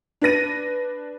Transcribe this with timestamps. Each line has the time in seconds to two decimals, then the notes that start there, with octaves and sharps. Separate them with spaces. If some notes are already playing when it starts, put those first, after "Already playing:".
0.22 D4 B4 A#6 D#7